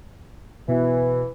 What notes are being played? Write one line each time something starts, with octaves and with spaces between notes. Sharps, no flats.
B2 E3